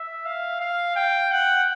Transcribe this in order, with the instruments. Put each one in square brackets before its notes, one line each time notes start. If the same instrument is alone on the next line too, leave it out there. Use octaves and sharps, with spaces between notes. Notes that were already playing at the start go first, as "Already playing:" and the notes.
Already playing: [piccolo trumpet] E5
F5
F5
G5
F#5